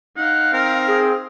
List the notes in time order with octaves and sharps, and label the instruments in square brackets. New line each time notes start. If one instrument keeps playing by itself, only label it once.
[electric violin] D#4 F5 [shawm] F#5
[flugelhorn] C4 [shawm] A#4
[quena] G#4